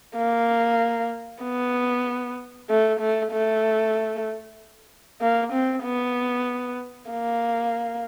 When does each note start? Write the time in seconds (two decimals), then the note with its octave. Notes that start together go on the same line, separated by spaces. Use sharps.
0.17 A#3
1.43 B3
2.69 A3
3.00 A3
3.32 A3
5.21 A#3
5.53 C4
5.84 B3
7.10 A#3